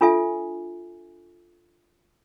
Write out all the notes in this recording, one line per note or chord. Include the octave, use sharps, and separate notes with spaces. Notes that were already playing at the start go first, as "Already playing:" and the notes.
D4 F4 A4 E5 G#5